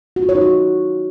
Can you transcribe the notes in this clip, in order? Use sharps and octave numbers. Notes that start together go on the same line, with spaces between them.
F#4
F4
C#5
D#4
F#4